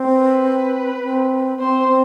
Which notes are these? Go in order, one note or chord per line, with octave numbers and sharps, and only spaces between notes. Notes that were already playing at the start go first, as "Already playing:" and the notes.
Already playing: C4
B4
C4
C4 C5
C4